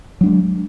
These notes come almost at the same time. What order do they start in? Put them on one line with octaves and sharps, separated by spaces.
F#3 D4 G#3